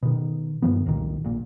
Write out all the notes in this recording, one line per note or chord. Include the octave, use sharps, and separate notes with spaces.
B2 D#3
G2 D#3 F3 B3
F1 C2 A#2 D#3
A#1 A#2